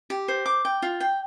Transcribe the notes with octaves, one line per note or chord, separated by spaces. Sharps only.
G4
C5
D6
G5
F4
G5